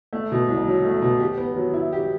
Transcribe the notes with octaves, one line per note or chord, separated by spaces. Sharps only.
A3
B2
C2
F#3
A3
B2
G4
B3
F#3
E4
G4